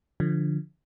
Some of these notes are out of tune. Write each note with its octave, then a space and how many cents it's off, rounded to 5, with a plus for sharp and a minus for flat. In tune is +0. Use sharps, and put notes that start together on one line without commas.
D3 +0 F3 -5